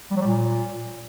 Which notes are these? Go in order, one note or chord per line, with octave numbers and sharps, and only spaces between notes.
G3
F#3
G3
A#2